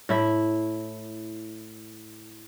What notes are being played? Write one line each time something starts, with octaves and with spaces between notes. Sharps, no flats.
A2 E4 E5